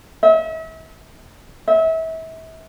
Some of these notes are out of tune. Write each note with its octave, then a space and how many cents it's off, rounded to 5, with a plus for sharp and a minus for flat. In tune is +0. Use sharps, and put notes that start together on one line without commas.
E5 -40
E5 -30